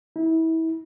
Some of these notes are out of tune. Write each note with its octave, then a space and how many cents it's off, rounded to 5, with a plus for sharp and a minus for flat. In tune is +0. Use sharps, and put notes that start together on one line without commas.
E4 -30